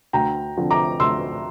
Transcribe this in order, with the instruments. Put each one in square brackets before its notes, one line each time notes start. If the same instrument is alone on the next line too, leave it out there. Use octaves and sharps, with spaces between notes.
[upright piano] D2 G5 A#5
D3 F3 C4
A#5 D6
D2 C6 E6